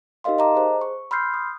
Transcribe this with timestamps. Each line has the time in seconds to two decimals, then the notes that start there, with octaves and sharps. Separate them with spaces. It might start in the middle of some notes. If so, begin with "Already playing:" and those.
0.24 D#4 G4 A#4 D#5 F5 C6
0.38 D#5 A5 A#5 D6
0.55 G#4 C5
0.81 C#6
1.11 B5 C6 E6 F6 G6 C7
1.34 D#6